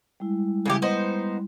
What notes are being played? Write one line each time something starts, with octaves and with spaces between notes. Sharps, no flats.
G3 G#3 E4
C#3 E3 G4
B3 D#4 C5